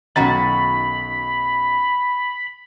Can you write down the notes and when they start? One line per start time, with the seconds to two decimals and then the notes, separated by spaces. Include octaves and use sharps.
0.16 B1 D#3 C#4 F#4 B5 A6